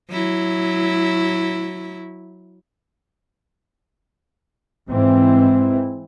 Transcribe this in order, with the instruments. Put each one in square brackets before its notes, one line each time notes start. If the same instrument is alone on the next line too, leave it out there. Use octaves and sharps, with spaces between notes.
[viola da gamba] F#3 E4
[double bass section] G#2 E3 C4